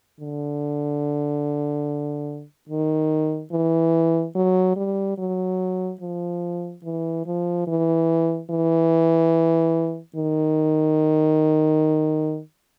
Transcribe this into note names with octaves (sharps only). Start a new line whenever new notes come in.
D3
D#3
E3
F#3
G3
F#3
F3
E3
F3
E3
E3
D#3